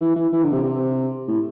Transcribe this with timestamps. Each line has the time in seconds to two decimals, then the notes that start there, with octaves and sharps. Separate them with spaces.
0.01 E3
0.16 E3
0.33 E3
0.43 D3
0.53 C3
0.64 C3
1.28 A2